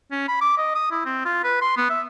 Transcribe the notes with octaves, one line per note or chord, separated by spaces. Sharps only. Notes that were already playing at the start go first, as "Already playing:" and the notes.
C#4
B5
D6
D#5
D#6
E4
C4
F4
B4
C6
B3
E5